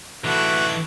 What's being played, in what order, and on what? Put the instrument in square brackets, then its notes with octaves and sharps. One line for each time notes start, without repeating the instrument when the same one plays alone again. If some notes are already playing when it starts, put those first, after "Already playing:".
[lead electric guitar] E3 D4 [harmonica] A3 E4 [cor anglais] F#4